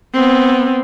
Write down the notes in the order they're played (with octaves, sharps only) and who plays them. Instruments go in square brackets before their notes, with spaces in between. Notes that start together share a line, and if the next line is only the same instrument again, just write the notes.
[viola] B3 C4